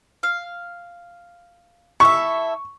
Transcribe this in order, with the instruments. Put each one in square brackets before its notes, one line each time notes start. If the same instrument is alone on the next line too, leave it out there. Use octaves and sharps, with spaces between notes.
[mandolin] F5
[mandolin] E4 A4 E5 [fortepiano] C#6